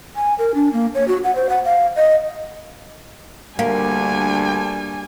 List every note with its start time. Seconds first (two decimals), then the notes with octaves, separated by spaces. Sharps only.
0.16 G#5
0.39 A#4
0.55 D4
0.73 A#3
0.95 C#5
1.08 F#4
1.24 F#5
1.36 C5
1.49 F#5
1.65 F5
1.96 D#5
3.59 D2 G3 A#3 D4 G#5